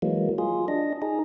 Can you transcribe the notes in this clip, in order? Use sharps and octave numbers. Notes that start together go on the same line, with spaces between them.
E3 F#3 G#3 A#3
F4 G#4
D4 D#5
D#4 G#4